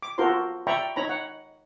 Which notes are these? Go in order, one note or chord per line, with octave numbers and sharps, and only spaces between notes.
D6
F4 F#4 A4 A#4 C5 C6
D5 E5 G5 A#5 B5 C#6
D#4 C#5 A#5 B5
F#5